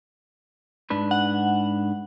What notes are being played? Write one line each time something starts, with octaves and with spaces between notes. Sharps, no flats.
G#2 D4 B4
F#5